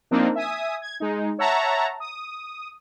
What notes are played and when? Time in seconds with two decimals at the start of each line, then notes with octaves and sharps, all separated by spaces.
0.11 F3 A#3 C4 D4 D#4
0.35 E5 G#5 D#6
0.82 G#6
1.00 G#3 D#4
1.39 C#5 E5 F#5 A5 A#5
2.00 D#6